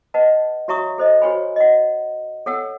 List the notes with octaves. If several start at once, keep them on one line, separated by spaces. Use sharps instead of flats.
B4 D#5 F#5 A5
F#4 C#5 E5 A#5 C#6 D#6
A4 C5 D#5
F#4 B4 C#5 G5 G#5 B5
D#5 F#5
A4 C#5 F#5 G5 E6